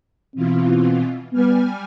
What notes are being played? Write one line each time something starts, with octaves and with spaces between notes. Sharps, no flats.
B2 E3 C4 F4
G3 B3 G#5 F6